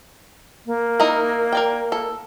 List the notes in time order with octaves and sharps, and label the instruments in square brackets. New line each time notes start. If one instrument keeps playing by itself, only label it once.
[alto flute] A#3
[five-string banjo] D#4 E4 A#4
A#4 D5 G5
A4